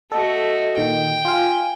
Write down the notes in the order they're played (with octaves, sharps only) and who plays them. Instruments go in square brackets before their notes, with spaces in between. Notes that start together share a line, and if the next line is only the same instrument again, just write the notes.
[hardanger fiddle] A3 F#4 [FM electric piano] A4 [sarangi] D#5
[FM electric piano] A#2 D#3 [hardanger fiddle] G5
[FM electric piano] F4 F5 [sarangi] G#5